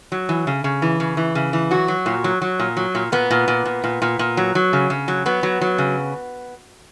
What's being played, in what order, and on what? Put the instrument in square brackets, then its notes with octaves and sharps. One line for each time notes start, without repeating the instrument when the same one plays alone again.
[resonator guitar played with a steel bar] F#3
E3
C#3
C#3
E3
C#3
E3
C#3
E3
F#3 F#4
F#3
A#2
F#3
F#3
A#2
F#3
A#2
A#2 B3
A#2
A#2
A#2
A#2
A#2
A#2
F#3
F#3
C#3
C#3
F#3
F#3 B3
F#3
F#3
C#3